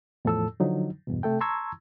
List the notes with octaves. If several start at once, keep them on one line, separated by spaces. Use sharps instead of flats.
E2 A2 F3 A4 A5 E6
D3 F3 F#3 D#4
E2 G2 B2
C3 A3 A4 G5
A5 A#5 C6 C#6 E6 G#6